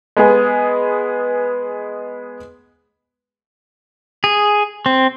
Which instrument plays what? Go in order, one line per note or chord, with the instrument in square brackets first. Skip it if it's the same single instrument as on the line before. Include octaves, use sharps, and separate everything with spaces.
[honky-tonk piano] G#3 B3 G#4
[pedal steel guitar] G#4
C4